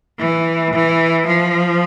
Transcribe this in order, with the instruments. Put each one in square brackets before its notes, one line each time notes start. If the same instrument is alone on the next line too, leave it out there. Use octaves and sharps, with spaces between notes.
[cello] E3
E3
F3